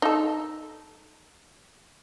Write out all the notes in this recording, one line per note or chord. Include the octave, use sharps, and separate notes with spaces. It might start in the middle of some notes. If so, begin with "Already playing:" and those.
D#4 A4